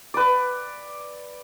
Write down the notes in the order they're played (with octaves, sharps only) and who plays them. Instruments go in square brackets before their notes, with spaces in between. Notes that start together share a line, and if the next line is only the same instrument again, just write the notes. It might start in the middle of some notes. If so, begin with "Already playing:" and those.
[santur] B4 D5